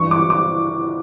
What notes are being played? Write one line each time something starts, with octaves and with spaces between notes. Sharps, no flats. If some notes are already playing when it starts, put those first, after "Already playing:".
Already playing: G2 E3 C#6
D6
D6